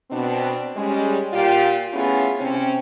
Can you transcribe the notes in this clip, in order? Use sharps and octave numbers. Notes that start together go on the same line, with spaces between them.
B2 C4 D4
G3 G#3 C#4
A#2 F4 G4
A3 B3 C#4 E4 F4 G#4
C3 C4 C#4